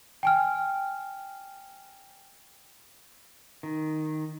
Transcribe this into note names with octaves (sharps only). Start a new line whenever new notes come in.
G5 G#5 F6
D#3